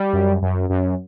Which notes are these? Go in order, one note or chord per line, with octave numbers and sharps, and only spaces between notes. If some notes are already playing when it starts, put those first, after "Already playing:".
Already playing: G3
F#2
F#2
F#2